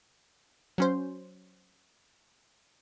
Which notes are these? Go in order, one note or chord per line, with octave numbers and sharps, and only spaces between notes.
F#3 C#4 C5